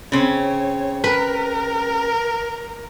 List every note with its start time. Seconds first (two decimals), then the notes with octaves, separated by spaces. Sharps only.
0.12 C#3 C4 C#5
1.04 A#4 B4